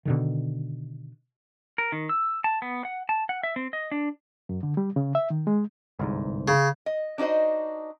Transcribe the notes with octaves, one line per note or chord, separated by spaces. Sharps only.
B2 D3 D#3
A#4
D#3
E6
A5
B3
F#5
A5
F#5
E5
C4
D#5
D4
F#2
D3
G3
C#3
E5
D#3
G#3
G1 C2 G#2
C#3
D#5
D4 D#4 F#4 C5 D#5